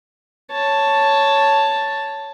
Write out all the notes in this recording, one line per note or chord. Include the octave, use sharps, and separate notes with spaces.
C#5 A5